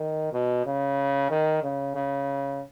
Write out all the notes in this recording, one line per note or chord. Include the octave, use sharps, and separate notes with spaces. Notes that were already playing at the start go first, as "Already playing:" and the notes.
Already playing: D#3
B2
C#3
D#3
C#3
C#3